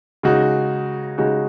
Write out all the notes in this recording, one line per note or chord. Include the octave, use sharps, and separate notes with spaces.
C#3 G#3 D#4 F#4
C#3 G#3 D#4 F#4